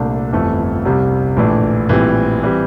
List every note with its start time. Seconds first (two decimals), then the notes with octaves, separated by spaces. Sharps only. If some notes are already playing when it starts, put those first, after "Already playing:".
Already playing: C2 A#2 A3 D4
0.33 G1 F2 E3 A3
0.85 C2 C3 G3
1.37 A#1 A2 E3 A3 D4
1.89 A#1 A2 E3 G3 C4
2.43 E3 G3 C4